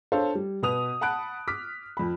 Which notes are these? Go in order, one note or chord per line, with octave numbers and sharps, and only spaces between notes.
D4 A4 C5 C#5 F5 A5
G3
B2 B4 D#6 F7
F#5 A5 B5 F#6 D7
D6 F6 B6
F2 B5